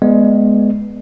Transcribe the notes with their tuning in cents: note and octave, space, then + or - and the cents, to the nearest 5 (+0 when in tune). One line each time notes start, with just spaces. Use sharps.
G#3 +15 B3 +0 D5 +35